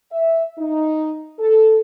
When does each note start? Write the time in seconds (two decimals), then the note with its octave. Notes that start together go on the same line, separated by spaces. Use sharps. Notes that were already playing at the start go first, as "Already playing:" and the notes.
0.12 E5
0.59 D#4
1.39 A4